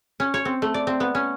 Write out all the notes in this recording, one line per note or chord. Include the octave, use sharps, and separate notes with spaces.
C#4
C#5
C4
A3
D5
C4
B3
C#4